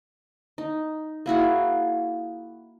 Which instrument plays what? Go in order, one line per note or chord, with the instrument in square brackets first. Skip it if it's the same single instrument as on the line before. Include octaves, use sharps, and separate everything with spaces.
[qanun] D#4
A#3 E4 F#4 G#4